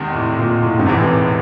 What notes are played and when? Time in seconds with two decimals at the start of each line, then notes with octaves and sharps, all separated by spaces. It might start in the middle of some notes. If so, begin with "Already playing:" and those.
Already playing: E2 C3 D#3 G#3
0.15 A2
0.39 A#2
0.63 A2
0.79 G#2
0.86 E1 E2 A2 C3 E3 G#3